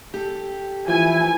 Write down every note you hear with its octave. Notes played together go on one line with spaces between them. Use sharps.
G4 A4
E3 F3 E4 G#5